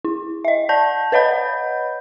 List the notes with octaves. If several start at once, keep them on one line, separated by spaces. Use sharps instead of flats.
E4
D#5 E5
D5 A5 G6
B4 C#5 D#5 F#5 B5 G6